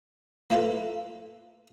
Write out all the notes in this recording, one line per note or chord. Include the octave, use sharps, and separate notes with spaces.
A#3 E4 F4 A4 B4